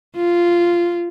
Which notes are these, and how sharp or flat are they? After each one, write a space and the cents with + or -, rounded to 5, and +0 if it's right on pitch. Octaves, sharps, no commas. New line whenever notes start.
F4 -10